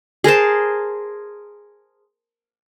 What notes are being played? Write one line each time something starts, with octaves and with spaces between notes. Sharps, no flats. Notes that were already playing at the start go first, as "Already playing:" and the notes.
G#4 A#4 C5 A5